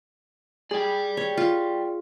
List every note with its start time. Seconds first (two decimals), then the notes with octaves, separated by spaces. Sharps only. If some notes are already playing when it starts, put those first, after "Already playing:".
0.71 G#4 D5 G5
1.17 C#5
1.37 F4